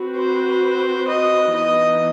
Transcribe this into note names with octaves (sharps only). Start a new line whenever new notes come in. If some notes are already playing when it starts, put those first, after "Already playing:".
Already playing: C4 F#4 B4
C5
D#5
E3 B3 D#4 D#5